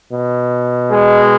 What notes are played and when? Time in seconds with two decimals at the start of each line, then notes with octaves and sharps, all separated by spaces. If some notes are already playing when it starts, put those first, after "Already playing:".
0.11 B2
0.89 G#3